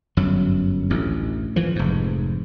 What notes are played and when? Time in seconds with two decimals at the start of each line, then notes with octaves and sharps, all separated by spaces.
0.17 G1 F#2 F#3
0.90 A1 D2
1.56 E3 F3
1.76 F1 G#2